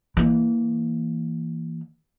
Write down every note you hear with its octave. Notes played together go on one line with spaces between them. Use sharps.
E3 A#3